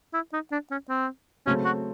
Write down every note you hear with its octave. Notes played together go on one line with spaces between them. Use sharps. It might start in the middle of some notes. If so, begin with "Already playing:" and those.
E4
D#4
D4
C#4
C4
C#3 F#3 A3 C4 C#4
F#4